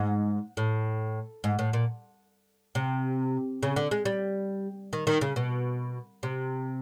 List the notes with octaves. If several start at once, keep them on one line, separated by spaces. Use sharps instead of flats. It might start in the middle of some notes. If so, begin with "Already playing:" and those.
Already playing: G#2
A2
G#2
A2
A#2
C3
C#3
D3
G#3
G3
D#3
D#3
C#3
B2
C3